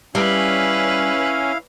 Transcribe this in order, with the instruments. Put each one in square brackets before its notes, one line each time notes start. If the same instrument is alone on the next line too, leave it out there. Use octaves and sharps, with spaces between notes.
[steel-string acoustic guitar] G3 [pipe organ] C#4 [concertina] E4 F5 [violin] B4